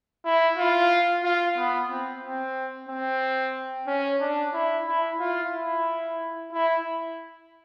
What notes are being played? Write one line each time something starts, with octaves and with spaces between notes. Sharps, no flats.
E4
F4
F4
B3
C4
C4
C4
C#4
D4
E4
E4
F4
E4
E4